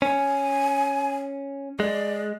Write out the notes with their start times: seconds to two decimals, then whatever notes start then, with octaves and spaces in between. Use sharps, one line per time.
0.02 C#4 G#5
1.80 G#3 D5